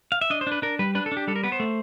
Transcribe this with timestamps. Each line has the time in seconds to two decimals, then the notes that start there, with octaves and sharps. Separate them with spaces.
0.12 F5
0.21 E5
0.30 D4 D#5
0.41 C5
0.47 D4 B4
0.62 D4 A#4
0.79 G3 B4
0.95 D4 B4
1.06 A4
1.12 D4
1.17 G4
1.27 G3 A4
1.36 A#4
1.44 B3 B4
1.52 C5
1.60 A3